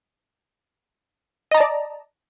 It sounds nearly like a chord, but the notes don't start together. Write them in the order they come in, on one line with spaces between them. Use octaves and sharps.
D#5 A#5 A5 D5